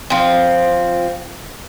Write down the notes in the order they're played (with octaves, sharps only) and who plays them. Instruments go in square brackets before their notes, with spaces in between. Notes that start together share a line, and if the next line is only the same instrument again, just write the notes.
[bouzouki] F3 C4